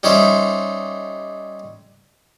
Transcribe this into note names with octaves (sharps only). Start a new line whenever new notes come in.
G3 C#4 D#4 C5 E5